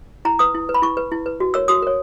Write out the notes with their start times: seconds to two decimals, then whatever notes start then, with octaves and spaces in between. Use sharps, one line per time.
0.25 E4 A#5
0.39 B4 D#6
0.55 E4
0.69 B4
0.74 B5
0.82 E4 C#6
0.97 B4
1.12 E4
1.26 B4
1.40 F#4
1.54 A#4 C#5 E6
1.68 F#4 D#6
1.82 A#4 C#5